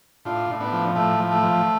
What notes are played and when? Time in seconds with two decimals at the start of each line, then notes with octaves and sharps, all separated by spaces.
0.25 A2 D4 F4
0.50 A2
0.60 B3 D4
0.72 F3
0.95 A2 A3
1.19 F3
1.31 A3
1.42 F3